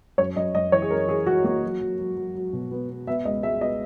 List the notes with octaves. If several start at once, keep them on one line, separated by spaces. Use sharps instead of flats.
F#2 C#5
F#2 D#5
F#2 D#5
E3 C#5
G#4
F#2 A#4
E3 G#4
E3 F#4
A#3 F#4
F#3
F#3
F#3
F#3
F#3
B2
B3
B3
B3 E5
C#2 D#5
G#3 E5
B3 D#5